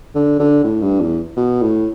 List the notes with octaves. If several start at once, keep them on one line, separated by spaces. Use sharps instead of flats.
D3
D3
A2
G2
E2
B2
A2